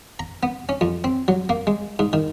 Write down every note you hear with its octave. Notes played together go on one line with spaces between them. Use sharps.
A#5
B3
C#4
F2
C4
F#3
A#3
G#3
G#2
D#3